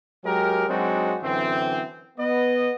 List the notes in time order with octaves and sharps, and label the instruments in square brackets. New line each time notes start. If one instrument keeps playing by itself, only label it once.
[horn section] F#3 G#3 G4 A#4
F#3 G#3 C4 D4 D#4 F#4
F#2 D3 E3 C4
B3 D#5